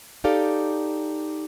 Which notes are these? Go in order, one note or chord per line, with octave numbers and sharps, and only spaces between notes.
D#4 G4 A4 D5 F5